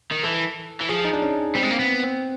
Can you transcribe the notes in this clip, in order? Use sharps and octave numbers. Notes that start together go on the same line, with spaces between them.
D#3
E3 A4
E3
F3 G#4
D#4
D4
C#4
G3 C4
G#3
A#3
B3
C4